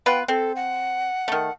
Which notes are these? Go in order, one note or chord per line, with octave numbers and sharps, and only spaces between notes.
B3 F4 B4 G5
C4 A4
F#5
D#3 A3